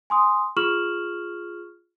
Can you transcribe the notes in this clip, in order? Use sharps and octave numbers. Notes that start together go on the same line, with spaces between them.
G#5 C6 D#6
F4 G#4 C#6 F6 E7 F#7